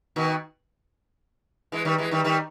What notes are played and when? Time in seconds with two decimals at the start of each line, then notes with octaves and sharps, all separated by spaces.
0.16 B2 D#3
1.72 E3 G#3
1.85 D#3 G3
1.98 E3 G#3
2.11 D#3 G3
2.24 D#3 G3